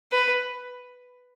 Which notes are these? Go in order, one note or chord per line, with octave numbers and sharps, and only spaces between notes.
B4